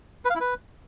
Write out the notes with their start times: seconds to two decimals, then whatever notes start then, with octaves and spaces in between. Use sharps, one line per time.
0.25 B4
0.30 F5
0.35 E4
0.41 B4